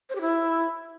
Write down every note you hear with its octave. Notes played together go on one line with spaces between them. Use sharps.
C5
G4
E4